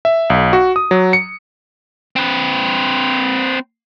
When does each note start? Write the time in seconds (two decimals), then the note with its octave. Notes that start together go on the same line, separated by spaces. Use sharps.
0.05 E5
0.30 B1
0.53 F#4
0.76 D#6
0.91 F#3
1.13 C#7
2.16 C4 B4